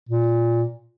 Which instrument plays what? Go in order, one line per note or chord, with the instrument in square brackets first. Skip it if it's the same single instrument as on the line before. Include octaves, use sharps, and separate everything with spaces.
[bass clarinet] A#2